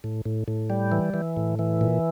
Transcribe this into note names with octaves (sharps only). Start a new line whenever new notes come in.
A2
A2
A2
G3
E3
E3
A2
E3
A#2